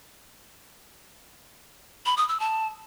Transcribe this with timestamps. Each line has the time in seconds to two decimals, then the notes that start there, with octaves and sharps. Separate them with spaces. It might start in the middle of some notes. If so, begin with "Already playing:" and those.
2.06 B5
2.17 D#6
2.28 E6
2.40 A5